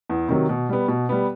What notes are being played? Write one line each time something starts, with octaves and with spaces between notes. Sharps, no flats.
E2
C3 D#3 F#3
B2
G3 B3
B2
G3 B3